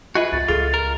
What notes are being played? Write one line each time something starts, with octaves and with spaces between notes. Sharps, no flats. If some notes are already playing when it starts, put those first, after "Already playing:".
F4 F#4 G#4 B4 D#5 E5
C#2 E4 A6
C#2 F4 G#4 A4
A#4